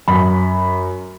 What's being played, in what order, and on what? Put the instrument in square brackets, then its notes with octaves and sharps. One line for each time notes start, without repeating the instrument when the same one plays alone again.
[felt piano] F#2 B5